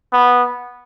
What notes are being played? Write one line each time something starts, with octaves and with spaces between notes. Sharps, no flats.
B3